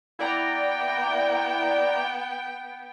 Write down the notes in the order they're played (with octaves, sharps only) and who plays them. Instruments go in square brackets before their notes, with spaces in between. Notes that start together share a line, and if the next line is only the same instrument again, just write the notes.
[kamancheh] B3 G5 [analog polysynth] E4 D5 A#5